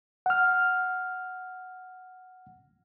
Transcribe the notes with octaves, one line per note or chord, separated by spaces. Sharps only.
F#5 F6